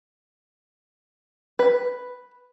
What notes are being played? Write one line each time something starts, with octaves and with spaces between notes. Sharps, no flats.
B4